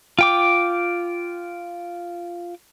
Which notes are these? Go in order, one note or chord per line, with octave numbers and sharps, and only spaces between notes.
F4 G5 D6